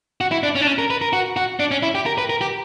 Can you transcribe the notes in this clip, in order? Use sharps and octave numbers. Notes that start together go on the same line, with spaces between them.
F#4
E4
D4
C#4
D4
C#4
A#4
B4
A#4
F#4
F#4
D4
C#4
E4
G4
A#4
B4
A#4
G4